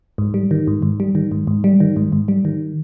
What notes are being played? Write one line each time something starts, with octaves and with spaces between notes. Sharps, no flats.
G#2
G3
D#3
G#2
G#2
G3
D#3
G#2
G#2
G3
D#3
G#2
G#2
G3
D#3